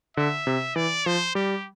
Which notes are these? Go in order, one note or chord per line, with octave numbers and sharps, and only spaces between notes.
D3 E5
C3
E3 D5
F3 C5
G3 G4